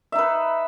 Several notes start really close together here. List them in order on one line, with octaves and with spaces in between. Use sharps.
E5 D#4 B4